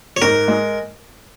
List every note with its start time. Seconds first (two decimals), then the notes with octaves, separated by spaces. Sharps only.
0.17 C#5
0.22 G#2 A#4
0.48 G#3